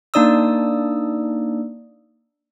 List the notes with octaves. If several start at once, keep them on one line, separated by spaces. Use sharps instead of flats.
A#3 D4 D#4 D5 D#6 E6